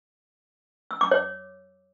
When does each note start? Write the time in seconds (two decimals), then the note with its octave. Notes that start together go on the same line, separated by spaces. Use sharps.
0.91 E6
1.01 D6
1.11 C#5